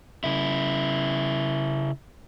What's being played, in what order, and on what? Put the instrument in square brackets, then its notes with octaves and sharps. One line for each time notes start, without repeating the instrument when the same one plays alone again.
[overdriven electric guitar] C#3 E4